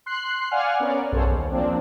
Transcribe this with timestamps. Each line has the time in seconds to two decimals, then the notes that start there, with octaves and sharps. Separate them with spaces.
0.06 C6 F#6 C7
0.51 D5 F5 F#5 G#5 F6
0.80 B3 C#4 A#4 D5
1.12 B1 G2 G#4 A4 C5 C#5
1.30 D#2
1.51 F3 A#3 C4 D4